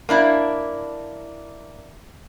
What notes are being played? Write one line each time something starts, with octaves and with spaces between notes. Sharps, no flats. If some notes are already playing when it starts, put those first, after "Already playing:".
A#3 D4 E4